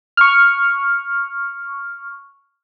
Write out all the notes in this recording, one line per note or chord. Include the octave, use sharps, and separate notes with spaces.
C#6 F6